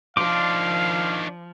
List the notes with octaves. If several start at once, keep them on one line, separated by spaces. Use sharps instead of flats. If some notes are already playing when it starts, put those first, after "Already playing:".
D#3 F3 D4 F5 C6 D6